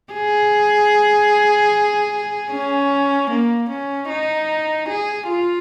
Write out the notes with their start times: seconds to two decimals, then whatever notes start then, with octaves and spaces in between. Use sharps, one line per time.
0.13 G#4
2.51 C#4
3.31 A#3
3.69 C#4
4.09 D#4
4.89 G#4
5.29 F4